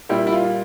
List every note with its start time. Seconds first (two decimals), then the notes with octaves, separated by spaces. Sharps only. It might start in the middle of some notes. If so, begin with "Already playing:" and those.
0.09 A#2 G3 A#3 E4
0.27 E4
0.32 F4